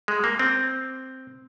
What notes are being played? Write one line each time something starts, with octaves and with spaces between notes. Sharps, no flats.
G#3
A#3
C4